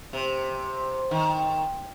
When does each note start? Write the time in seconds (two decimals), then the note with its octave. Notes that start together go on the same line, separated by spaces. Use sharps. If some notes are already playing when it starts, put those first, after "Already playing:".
0.13 C3
1.11 D#3